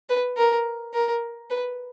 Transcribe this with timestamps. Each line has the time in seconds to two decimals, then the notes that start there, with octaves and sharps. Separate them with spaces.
0.09 B4
0.37 A#4
0.94 A#4
1.50 B4